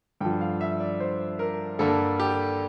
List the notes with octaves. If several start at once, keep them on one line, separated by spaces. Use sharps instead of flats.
G2 D3 F3 G5
F5
E5
D5
C5
A#4
G2 D3 G3 A#3 A4
G4